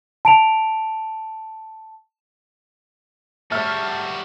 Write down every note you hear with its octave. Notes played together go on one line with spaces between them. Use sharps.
A5 D7 F7
G3 F#4 E5 A5 F6